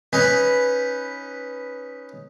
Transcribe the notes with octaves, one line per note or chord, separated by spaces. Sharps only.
C#4 D#4 B4